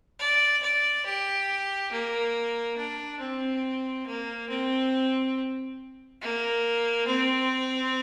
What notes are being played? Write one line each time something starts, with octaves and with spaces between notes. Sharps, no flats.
D5
D5
G4
A#3
D4
C4
A#3
C4
A#3
C4